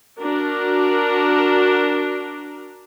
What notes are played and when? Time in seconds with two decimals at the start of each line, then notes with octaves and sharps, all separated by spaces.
0.21 D4 F#4 A#4